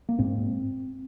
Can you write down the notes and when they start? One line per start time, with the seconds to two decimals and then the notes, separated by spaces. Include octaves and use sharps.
0.09 A#3
0.19 G#2 C4